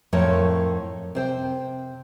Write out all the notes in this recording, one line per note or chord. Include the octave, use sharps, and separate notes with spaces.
F2 A2 A#4 C#5 A5
C3 C5 G5